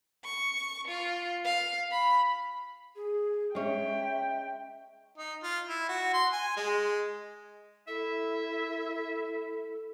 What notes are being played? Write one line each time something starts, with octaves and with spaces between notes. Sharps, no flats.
C#6
F4
F5
B5
G#4
G#3 C#4 E5 G5
D#4
F4
E4
F#4
C6
G#5
G#3
E4 A4 E5